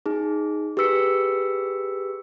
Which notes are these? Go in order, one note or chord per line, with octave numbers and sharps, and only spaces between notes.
D#4 G#4
G4 G#4 B4 E6 B6 C#7